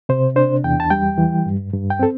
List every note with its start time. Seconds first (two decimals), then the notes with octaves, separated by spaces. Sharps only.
0.09 C3 C5
0.36 D4 C5
0.64 E2 G5
0.80 A5
0.90 G3 G5
1.18 E3
1.46 G2
1.73 G2
1.90 G5
1.99 C4 A4